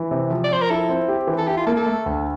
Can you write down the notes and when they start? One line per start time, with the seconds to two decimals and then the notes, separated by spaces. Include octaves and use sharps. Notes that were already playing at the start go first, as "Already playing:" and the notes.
Already playing: E3
0.11 C3
0.31 F3
0.44 D5
0.51 F3 C5
0.62 A#4
0.70 E4 A4
0.89 C4
1.08 G4
1.27 E3
1.38 A4
1.47 E4 G4
1.57 F4
1.66 A#3 A4
1.77 A4
1.86 A3
2.06 D2